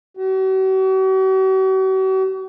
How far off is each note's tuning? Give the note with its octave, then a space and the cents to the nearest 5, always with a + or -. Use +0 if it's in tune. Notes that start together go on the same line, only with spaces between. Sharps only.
F#4 +45